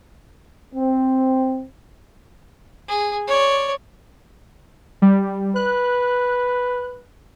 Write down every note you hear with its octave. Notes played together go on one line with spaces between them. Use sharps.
C4
G#4
C#5 D5
G3
B4 F#6